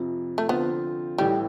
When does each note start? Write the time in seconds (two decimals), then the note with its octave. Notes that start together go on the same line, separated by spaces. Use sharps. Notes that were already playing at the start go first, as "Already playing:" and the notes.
Already playing: F2 C3 F3
0.38 A3
0.49 D3 F3 B3 C4 F4
1.18 A1 A2 E3 G3